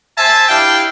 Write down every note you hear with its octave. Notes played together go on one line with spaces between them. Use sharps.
C5 E5 G#5 A5
D4 E4 G4 F5 G5